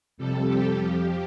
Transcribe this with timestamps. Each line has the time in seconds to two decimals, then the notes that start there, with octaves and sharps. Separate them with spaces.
0.18 F2 C3 G3 A4
0.47 G4
0.76 F2 F3